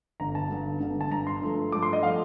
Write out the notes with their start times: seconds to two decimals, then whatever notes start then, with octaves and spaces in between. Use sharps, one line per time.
0.20 G1 G2 D3 A#5
0.35 A5
0.49 G1 G2 D3
0.80 G1 G2 D3
1.01 A5
1.11 G1 G2 D3 A#5
1.27 C6
1.42 G2 F3 A3
1.72 G2 F3 A3 D6
1.83 C6
1.93 D#5
2.03 F3 A3 F5